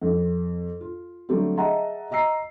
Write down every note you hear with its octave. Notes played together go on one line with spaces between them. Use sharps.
F2
F4
D3 F#3 G3 A3 C4
G#4 D#5 E5 F#5 A5 A#5
D#5 A#5 E6 C7